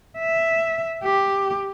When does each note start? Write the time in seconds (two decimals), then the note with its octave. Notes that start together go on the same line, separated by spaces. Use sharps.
0.18 E5
1.03 G4